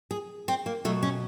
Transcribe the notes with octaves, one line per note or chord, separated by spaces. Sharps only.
G#4
C4
A#3
B2 F#3 A3
C#4